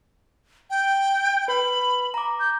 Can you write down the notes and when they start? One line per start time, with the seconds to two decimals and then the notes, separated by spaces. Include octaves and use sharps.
0.70 G5
1.48 B4 B5
2.14 A#5 D6
2.40 G6